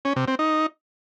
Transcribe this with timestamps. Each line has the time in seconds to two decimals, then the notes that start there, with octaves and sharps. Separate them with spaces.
0.05 C#4
0.16 C3
0.28 C4
0.39 D#4